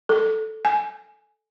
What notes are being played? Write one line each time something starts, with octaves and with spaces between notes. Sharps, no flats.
A4
G#5